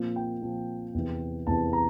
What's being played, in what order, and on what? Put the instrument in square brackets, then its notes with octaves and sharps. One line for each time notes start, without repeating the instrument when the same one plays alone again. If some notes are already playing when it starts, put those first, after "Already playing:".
Already playing: [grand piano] A#2 F3 C4
G5
A#2 F3 C4
E2 C3 E3
E2 C3 E3 A5
A#5